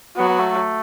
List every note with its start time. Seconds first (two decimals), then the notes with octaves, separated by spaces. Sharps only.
0.17 F#3 B3
0.29 B3
0.39 A3
0.50 A3